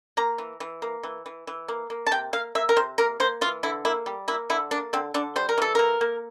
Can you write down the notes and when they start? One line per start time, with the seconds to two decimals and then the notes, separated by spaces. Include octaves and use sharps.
0.17 A#3 A#5
0.38 E3
0.60 E3
0.82 A#3
1.03 E3
1.26 E3
1.47 E3
1.68 A#3
1.90 A#3
2.06 A5
2.11 C3 G5
2.33 A#3 F5
2.55 A#3 E5
2.69 A#4
2.76 C3 C5
2.98 A#3 A#4
3.20 A#3 C5
3.41 E3 F4
3.63 D3 E4
3.85 A#3 E4
4.06 G3
4.28 A#3 E4
4.50 D3 E4
4.71 A#3 D4
4.93 D3 C4
5.14 D3 D4
5.36 G3 C5
5.49 A#4
5.58 E3 A4
5.75 A#3 A#4
6.01 A#3